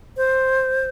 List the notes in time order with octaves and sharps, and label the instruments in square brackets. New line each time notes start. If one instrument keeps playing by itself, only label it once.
[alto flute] C5